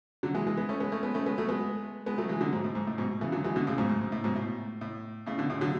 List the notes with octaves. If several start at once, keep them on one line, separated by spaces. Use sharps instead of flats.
D3 F#3
E3 G#3
E3 G#3
G#3 B3
A3 C#4
G#3 B3
A3 C#4
G#3 B3
A3 C#4
G#3 B3
F#3 A3
G#3 B3
G#3 B3
F#3 A3
E3 G#3
D3 F#3
G#2
A2
G#2
A2
G#2 B2
C#3 E3
D3 F#3
E3 G#3
B2 D3
A2 C#3
G#2 B2
G#2
G#2
A2
G#2 B2
A2
A2
A2 C#3
B2 D3
A2 C#3
D3 F#3